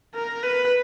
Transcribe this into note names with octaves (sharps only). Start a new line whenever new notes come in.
A#4
B4